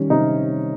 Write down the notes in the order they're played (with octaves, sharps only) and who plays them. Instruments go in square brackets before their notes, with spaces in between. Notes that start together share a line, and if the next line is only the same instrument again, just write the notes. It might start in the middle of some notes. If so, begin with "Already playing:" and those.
Already playing: [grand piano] D#3 G3 [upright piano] C#4
[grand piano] C3 [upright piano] D#4